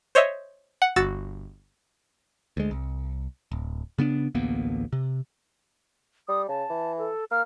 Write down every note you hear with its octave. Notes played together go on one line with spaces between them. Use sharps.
C5 C#5 D#5 E5
F#5
G1 F#4 E6 A6
D2 G#3
C2
D1
C#3 B3 C4 D4
A1 D2 A#3 B3
C3
G3 D#6
C#3 A5
E3
A4
A#3 F6